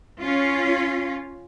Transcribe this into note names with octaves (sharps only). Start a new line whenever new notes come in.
C#4 F4